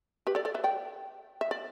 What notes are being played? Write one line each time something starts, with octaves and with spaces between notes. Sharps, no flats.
G4 B4
A4 D5
A4 D5
B4 E5
D5 G5
E5
D5